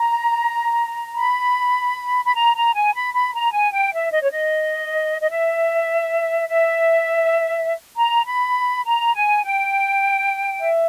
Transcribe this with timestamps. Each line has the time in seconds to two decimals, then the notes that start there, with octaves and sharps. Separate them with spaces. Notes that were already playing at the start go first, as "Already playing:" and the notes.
Already playing: A#5
1.16 B5
2.25 B5
2.35 A#5
2.55 A#5
2.74 G#5
2.93 B5
3.13 B5
3.34 A#5
3.53 G#5
3.73 G5
3.92 E5
4.11 D#5
4.22 C#5
4.32 D#5
5.20 D#5
5.29 E5
6.48 E5
7.96 A#5
8.25 B5
8.84 A#5
9.14 G#5
9.43 G5
10.60 E5